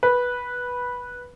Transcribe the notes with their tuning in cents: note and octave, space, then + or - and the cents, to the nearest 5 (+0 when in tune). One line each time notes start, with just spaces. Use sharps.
B4 -10